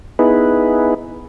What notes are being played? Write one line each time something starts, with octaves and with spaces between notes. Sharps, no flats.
B3 D#4 E4 G#4 B4